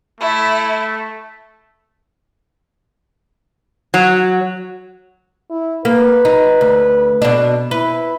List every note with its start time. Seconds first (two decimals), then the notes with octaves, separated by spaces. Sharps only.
0.21 A3 E4
3.94 F#3
5.50 E4
5.85 A#3 B4
6.25 D#4
6.61 D2
7.22 B2 D4
7.71 E4 B4